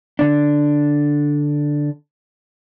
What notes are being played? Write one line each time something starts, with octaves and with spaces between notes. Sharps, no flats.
D3 D4